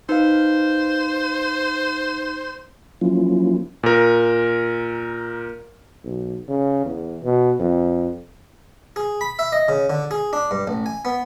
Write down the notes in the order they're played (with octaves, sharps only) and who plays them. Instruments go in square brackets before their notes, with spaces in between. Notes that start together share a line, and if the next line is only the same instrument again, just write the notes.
[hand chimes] D#4 B4 F5 [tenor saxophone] C5
[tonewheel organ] F3 F#3 A#3 C#4 E4 F4
[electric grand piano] A#2 A#4
[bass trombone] B1
C#3
E2
B2
F2
[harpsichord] G#4
B5
E5
D#5
C#3
D3
G#4
D4
G2
A1
G#5
B3